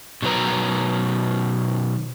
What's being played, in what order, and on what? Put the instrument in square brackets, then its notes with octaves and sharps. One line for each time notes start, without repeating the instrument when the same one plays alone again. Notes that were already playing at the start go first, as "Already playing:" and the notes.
[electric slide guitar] B2 D#3 F#3 B4 A#5